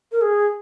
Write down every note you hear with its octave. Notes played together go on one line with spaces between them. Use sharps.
A#4
G#4